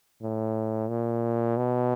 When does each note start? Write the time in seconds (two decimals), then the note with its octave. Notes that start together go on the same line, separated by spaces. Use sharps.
0.22 A2
0.89 A#2
1.57 B2